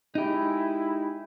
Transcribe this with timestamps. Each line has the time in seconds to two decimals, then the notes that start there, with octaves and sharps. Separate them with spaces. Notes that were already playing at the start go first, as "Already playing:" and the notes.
0.15 G#3 D#4 E4 G4